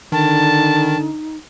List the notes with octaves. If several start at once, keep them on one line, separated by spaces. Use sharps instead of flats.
D3 D#3 D#4 A5